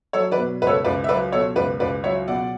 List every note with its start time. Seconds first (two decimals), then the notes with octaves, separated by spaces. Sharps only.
0.13 F#3 A4 C#5
0.31 B4 D5
0.37 B2
0.62 C#2 B4
0.67 A4 C#5
0.84 C#2 B4 D5
1.04 E5
1.08 F#3 B4 D5
1.32 B2 A4 C#5
1.56 C#2 B4 D5
1.80 C#2 B4 D5
2.04 F#3 C#5 E5
2.27 B2 D5 F#5